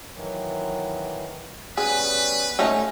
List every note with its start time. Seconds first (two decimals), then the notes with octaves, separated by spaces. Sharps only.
0.14 D#3 E3 F#3
1.77 G3 B3 C#4 G#4 B4
2.59 C#3 A3 C#4 D#4